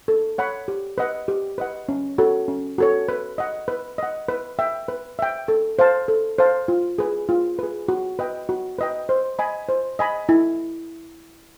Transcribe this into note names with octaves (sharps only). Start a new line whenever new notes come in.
A4
C#5 F#5 B5
G4
B4 D#5 F#5
G4
B4 D#5 F#5
C#4
F#4 A4 C#5
C#4
F#4 A4 C#5
B4
D#5 F#5
B4
D#5 F#5
B4
E5 G5
B4
E5 G5
A4
C5 F5 A5
A4
C5 F5 A5
F4
G#4 B4
F4
G#4 B4
F#4
B4 D#5 G5
F#4
B4 D#5 G5
C5
D#5 G#5 B5
C5
D#5 G#5 B5
E4